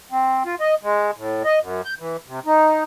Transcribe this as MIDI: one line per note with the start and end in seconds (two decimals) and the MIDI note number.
0.11 0.43 60
0.46 0.55 65
0.60 0.75 75
0.83 1.11 56
1.17 1.43 45
1.44 1.59 75
1.61 1.81 42
1.85 1.94 91
2.00 2.17 52
2.27 2.40 48
2.46 2.84 63